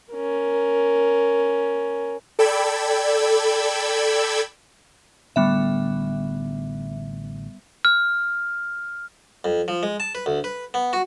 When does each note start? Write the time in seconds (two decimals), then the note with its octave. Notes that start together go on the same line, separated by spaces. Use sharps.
0.13 C#4 A#4
2.39 A4 D5 G5 B5 E6 G#6
5.36 A1 D3 G3 A3 B3 E5
7.85 F6
9.44 F2
9.68 F3
9.83 G#3
10.00 A5
10.15 B4
10.26 D2
10.44 B4
10.74 B3
10.93 F#4